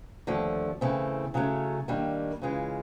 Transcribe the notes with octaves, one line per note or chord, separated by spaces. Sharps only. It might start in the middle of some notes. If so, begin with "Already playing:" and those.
D#2 D3 F3 A3
C#3 E3 A3 C4
C#3 F#3 A3 C#4
D#3 G3 A#3 D4
C#3 E3 G#3 C#4 F4